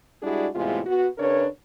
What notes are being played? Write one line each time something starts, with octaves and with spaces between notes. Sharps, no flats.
G3 G#3 D4 E4 F#4 G#4
E2 A2 C3 G#3 F4
B3 F#4
C#3 D4 A#4 B4 C#5